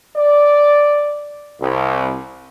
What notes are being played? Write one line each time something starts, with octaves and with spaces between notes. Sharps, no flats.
D5
C2